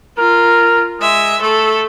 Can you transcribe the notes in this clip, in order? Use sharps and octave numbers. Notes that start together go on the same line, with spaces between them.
F4 A#4
G#3 E5
A3 A4